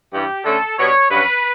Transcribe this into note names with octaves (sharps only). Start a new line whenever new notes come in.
G2 E3 G3 G4
D3 A3 C#4 A4
B2 G3 B3 D4 C#5
G2 F#3 C#4 B4